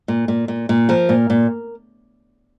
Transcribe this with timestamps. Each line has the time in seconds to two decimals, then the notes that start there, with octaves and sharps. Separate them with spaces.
0.08 A#2
0.28 A#2
0.48 A#2
0.69 A#2
0.89 F3 A#4
1.09 A#2
1.30 A#2